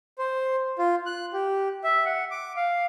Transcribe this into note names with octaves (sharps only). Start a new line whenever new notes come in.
C5
F4
F#6
G4
E5
F#5
D6
F5